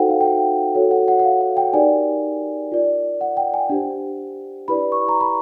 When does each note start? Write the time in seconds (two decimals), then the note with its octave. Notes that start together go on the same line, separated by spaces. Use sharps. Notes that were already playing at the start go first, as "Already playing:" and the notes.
Already playing: D#4 F#4 A4 C5 F#5 G5
0.09 F5
0.21 G5
0.26 F#5
0.75 F#4 A4 C#5
0.91 F#5
1.08 F#5
1.19 F#5
1.25 F5
1.41 F#5
1.57 G5
1.73 D#4 G4 A#4 D5 G#5
2.72 F4 A#4 D5
3.21 F#5
3.37 G5
3.54 G#5
3.70 D4 G4 C5
4.68 E4 G4 B4 D5 B5
4.92 C#6
5.09 A#5
5.21 B5